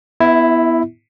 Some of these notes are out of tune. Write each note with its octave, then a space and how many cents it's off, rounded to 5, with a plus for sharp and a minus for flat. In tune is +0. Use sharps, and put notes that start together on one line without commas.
B3 +5 E4 +5 E5 -30